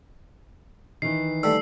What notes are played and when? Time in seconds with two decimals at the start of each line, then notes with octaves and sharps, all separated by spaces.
1.02 D#3 E3 C7
1.43 G3 A3 E6